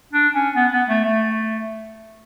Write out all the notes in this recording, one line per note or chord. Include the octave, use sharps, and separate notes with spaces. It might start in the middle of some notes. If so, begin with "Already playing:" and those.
D4
C#4
B3
B3
A3
A3